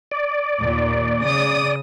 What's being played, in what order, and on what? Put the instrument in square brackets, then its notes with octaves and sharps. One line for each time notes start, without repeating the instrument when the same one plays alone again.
[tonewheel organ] D5
[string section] D#2 A#2
C#3 D#6